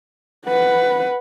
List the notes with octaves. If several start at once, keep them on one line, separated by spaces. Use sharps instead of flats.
B4 F#5